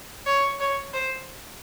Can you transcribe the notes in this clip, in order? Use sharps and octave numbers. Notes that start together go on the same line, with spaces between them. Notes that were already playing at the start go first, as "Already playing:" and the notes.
C#5
C#5
C5